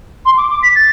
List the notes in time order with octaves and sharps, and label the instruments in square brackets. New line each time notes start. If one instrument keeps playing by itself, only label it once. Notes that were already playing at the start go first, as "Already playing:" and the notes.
[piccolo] C6
D6
D6
B6
A6